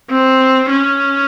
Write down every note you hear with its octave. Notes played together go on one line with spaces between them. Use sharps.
C4
C#4